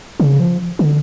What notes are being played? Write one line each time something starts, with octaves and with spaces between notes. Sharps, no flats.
C#3
F3
D3